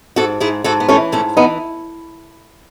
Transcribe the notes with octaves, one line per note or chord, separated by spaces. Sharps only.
G#2 F#4 A4
G#2 E4 G#4
G#2 F#4 A4
B3
E3 A3 C#4
G#2 A3 C#4
E3 B3 D#4